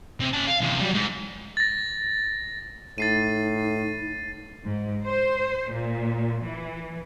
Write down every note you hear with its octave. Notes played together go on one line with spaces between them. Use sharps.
C3
C#4 A5
F5
E2 C3
F#3 G3
G#2
A6 A#6
A2 D#4 A6 C7 D#7
G#2
C5
A#2
E3